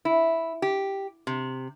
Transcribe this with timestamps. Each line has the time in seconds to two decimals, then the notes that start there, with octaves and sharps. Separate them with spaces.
0.05 E4
0.62 G4
1.27 C3